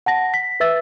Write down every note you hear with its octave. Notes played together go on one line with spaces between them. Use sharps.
F#5 A5 A#6
B6
B4 E5 E6 A6